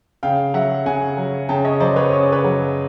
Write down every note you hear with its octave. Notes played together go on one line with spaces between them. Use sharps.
C#3 F5 G5
F#3 E5 F#5
C#3 F#5 G#5
F#3
C#3 G5 A5
C#5 D#5
F#3 C5 D5
B4 C#5
C#3 C#5
D5
B4 C#5
F#3